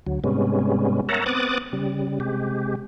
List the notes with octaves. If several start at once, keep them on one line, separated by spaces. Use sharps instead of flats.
D2 F#3
G#2 C3 G3 G#3 B3 C#4
A#4 C#5 E5 F#5 A5 A#5
B3 C4 D6 D#6 F#6 A6
C#3 G3
C3 G#3 G4